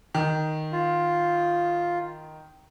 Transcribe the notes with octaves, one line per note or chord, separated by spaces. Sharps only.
D#3
F4